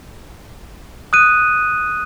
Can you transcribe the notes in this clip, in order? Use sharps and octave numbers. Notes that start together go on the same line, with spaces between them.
D#6 F#6 D#7